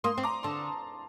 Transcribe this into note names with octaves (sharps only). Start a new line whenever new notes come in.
A#3 C6 D#6
C4
A#5 D6
D3 A5 C6